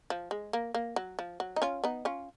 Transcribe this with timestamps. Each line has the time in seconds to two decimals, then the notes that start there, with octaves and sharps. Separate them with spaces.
0.10 F3
0.31 G#3
0.53 A#3
0.74 A#3
0.96 F#3
1.19 F3
1.40 F#3
1.56 D#4
1.62 C#4 F4
1.84 B3 D#4
2.05 C#4 F4